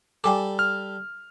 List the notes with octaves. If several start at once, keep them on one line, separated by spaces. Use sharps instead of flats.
G3 A4 G5 G#5 D6
F6